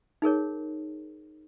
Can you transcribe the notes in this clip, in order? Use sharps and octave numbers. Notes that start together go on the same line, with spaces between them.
D#4 G#4 A#4 C#5